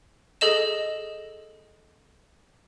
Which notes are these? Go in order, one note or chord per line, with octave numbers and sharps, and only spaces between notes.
G#4 A4 D#5 E7